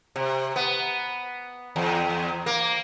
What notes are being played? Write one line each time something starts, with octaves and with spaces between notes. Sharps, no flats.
C3
B3
E2
A#3